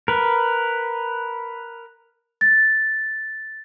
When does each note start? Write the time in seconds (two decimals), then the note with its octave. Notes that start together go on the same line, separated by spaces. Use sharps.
0.08 A#4 B4
2.41 A6